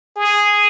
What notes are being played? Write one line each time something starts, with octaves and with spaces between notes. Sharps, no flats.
G#4